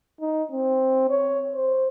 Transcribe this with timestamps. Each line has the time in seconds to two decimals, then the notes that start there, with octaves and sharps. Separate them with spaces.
0.21 D#4
0.52 C4
1.10 C#5
1.55 C5